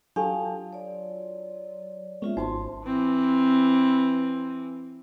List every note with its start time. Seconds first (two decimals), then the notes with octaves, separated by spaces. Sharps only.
0.16 F#3 D4 F4 G4 A4 F5 G5 A5
0.73 C#5 D5
2.22 G#3 A#3 B3 C#4 F4 E5
2.37 G#1 D#4 F#4 C5 A5 C6
2.85 E3 C4